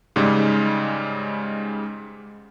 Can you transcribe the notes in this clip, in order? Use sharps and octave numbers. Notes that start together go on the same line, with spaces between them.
G#2 C#3 G3 G#3